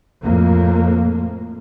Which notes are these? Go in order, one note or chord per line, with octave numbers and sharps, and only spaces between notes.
F2 A2 A#3